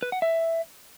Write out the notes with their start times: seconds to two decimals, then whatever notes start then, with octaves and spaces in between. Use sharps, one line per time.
0.03 B4
0.12 F#5
0.22 E5